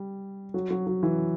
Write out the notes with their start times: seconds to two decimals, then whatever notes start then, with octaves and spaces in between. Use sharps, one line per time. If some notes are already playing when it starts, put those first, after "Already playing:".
Already playing: G3
0.54 F#3
0.70 F#3
0.87 F#3
1.03 E3